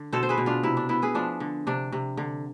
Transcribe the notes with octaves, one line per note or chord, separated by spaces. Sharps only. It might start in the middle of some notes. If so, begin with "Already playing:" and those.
Already playing: D3
B2 A4 C5
C5
G#4 B4
B2
D4 F4
C3 E4
D4
B3 E4
G#4 B4
F3 D4
D3
C3 D4
C3
D3